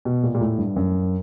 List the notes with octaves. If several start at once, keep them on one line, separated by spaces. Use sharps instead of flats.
B2
A#2
A#2
A2
G2
F#2